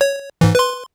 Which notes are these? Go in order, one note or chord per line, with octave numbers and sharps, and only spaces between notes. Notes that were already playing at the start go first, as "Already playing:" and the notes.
C#5
G#2 E3
B4 C6